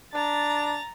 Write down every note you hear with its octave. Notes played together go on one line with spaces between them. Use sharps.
D4 A#5 A6